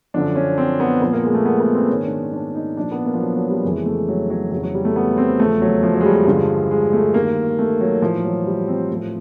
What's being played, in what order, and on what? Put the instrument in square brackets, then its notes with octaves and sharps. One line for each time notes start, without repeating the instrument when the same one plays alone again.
[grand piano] F#2 D3 F3 D4
C#4
C4
B3
A#2 F3 B3
A#3
G#3
A3
B3
B3
C4
G#2 D#3 C#4
D4
D4
D#4
A#2 F3 D4
B3
A#3
F3
F#3
F#3
G3
F2 C#3 E3 G#3
A3
F#3
F#3
F2 C#3 E3 F#3
F#3
G3
A3
B3
C4
E2 C#3 F3 A3
F#3
F3
F#3
G#3
G3
G#3
G2 D3 F3
G#3
A3
G2 D#3 A#3
A3
F#3
A2 E3 F3
F#3
G3
C4
A2 F3